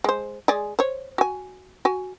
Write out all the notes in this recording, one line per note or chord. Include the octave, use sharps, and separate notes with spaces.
G#3 C5
G#3 G#4 D5
C5 C#5
F#4 G#5
F#4 G#5